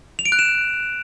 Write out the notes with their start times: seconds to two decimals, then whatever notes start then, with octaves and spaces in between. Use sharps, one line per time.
0.19 F7
0.26 D7
0.32 F#6
0.39 E7